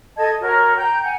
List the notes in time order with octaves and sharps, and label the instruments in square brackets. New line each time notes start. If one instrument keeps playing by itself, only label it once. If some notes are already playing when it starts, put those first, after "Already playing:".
[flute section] A4 D#5 A5 G#6
F#4 A#4 C#5
G5 A#5 G6
F#5 G#5